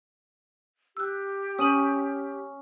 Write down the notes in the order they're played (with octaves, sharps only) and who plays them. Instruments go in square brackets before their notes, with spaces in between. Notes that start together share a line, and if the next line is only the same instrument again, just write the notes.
[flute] G4 [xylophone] E6 F#6
[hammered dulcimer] C#4 [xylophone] D#6 D#7 F#7